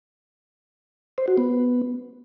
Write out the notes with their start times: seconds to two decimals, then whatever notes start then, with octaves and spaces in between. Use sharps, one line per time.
1.18 C5
1.28 F#4
1.38 B3